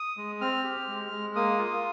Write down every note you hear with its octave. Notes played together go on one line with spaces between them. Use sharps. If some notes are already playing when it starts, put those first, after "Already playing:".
Already playing: D#6
G#3
C4 F6
G4
G#3
G#3
A#3 D#6
F4